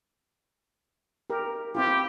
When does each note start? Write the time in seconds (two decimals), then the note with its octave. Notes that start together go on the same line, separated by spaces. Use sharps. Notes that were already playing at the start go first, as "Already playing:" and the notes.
1.30 G4 A#4
1.75 C4 E4 F4 G4